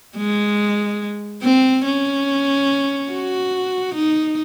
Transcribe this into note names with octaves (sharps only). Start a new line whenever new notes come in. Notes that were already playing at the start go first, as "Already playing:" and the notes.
G#3
C4
C#4
F#4
D#4